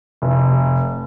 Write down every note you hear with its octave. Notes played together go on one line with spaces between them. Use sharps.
F1